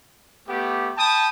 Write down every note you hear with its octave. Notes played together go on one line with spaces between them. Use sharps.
A3 B3 G4
G5 A5 B5 D#6